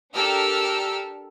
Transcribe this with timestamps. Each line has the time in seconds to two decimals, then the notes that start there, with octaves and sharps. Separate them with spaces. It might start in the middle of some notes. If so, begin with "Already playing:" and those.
0.14 D4 G4 A4 A#4 E6 F6